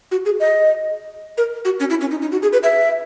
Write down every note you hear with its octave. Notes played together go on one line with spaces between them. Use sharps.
F#4
G#4
D#5
A#4
F#4
C#4
E4
C#4
D#4
D#4
F#4
G#4
B4
E5